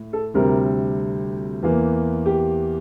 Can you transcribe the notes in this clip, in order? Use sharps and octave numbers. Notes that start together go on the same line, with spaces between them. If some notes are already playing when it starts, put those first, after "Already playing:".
Already playing: A2
A4
D2 C3 G3 C4 A#4
E2 E3 A#3
G4